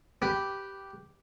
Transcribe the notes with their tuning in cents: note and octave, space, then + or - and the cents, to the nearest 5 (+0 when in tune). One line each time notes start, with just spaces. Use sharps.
G4 -5 B4 +0